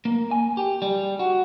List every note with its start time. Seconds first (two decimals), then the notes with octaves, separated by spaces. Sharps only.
0.05 A#3
0.31 G#5
0.57 G4
0.82 G3
1.19 F#4